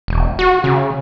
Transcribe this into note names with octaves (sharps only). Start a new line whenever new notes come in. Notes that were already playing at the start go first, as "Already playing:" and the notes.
E1
F#4
C#3